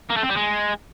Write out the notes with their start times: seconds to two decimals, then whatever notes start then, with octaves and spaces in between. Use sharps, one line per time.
0.10 A#3
0.16 A3
0.23 C4
0.29 G3
0.36 G#3